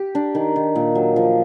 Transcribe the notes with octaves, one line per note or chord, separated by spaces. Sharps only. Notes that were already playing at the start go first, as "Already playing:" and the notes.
Already playing: G4
D4
D#3
D#3
A#2
F#3
F3